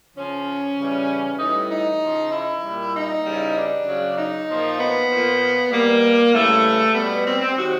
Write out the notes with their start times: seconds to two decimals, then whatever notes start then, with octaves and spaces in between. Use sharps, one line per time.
0.15 C#3 F3 C#4
0.77 C#3 E3 G3
1.39 A2 E3 G3 D#4
1.69 D#4
2.01 C#3 F3
2.32 E4
2.62 A#2 G3
2.93 D#4
3.24 C#3 E3 G3
3.56 D4
3.87 C#3 F#3
4.17 D#4
4.47 A#2 F3
4.79 B3
5.09 A#2 F3
5.71 B2 G3 A#3
6.33 C#3 E3 G3 A3
6.94 B2 G3 B3
7.25 C4
7.40 C4
7.56 C3 D#3 F#3 F#4